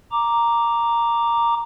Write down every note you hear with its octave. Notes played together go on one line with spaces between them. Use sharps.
A#5 D6